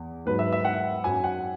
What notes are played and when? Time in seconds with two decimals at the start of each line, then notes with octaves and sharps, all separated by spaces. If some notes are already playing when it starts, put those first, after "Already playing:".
Already playing: E2
0.26 G#2 F#3 B4
0.39 E5
0.52 E5
0.65 F#5
1.04 F#2 F#3 G#5
1.24 F#5